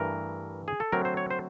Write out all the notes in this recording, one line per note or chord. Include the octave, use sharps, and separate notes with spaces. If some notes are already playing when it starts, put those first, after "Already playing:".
Already playing: G2 E3 A3 A#4
G#4
A4
D3 F#3 A3 C4 A#4
C5
C#5
C5